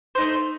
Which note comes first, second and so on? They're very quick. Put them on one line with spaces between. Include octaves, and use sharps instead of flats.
C5 D#4 A3